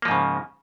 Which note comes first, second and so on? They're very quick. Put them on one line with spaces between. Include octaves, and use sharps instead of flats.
A#3 F3 G#2 C#3